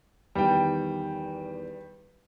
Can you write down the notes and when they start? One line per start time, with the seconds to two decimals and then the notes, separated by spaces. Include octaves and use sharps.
0.35 E2 D#3 G3 G5